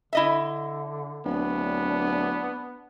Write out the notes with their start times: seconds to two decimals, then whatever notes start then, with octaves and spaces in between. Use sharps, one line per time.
0.13 D3 E4 D#5 E5
1.26 D1 B3 D4